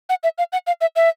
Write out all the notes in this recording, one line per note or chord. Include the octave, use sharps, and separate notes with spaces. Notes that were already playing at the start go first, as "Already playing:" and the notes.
F#5
E5
F5
F#5
F5
E5
E5